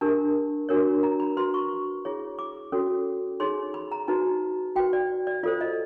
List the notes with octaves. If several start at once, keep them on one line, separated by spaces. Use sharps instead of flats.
D4 G4 A#4 A5
D4 F#4 A#4 C#5
A#5
B5
F#4 B4 C6
C#6
E4 G#4 C#5
D6
C#4 F#4 A4 C#5
D#4 G#4 C#5 C6
B5
A#5
D#4 F#4 B4 A5
F#4 B4 G5
D5
D5
F4 A4 C5 D5
D#5